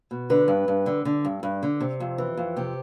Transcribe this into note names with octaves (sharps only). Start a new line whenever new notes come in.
B2
D3 B4
G2
G2
D3
D3
G2
G2
D3
C3
F2
E3
F2
C3 G4